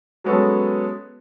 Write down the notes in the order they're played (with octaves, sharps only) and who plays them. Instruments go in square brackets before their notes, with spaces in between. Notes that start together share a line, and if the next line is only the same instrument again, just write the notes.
[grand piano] F#3 G#3 B3 C#4 A4